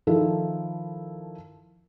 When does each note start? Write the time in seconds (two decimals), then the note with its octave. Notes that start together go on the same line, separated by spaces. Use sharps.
0.07 D#3 F3 E4 A4 A#4